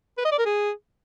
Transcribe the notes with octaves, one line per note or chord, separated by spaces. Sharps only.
B4
D#5
D5
A#4
G#4